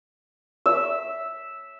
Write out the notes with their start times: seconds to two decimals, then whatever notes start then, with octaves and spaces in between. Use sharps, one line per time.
0.66 E5